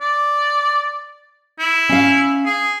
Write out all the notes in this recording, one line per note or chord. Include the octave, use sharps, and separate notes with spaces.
D5
E4
C#4 F5
G#4